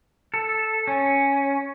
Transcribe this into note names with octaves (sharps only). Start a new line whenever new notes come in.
A4
C#4